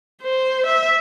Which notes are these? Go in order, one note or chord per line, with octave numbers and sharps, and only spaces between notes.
C5
E5